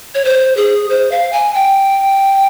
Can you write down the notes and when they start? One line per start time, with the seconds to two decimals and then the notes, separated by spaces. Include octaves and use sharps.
0.15 C#5
0.25 C5
0.57 G#4
0.90 C5
1.12 F5
1.33 G#5
1.54 G5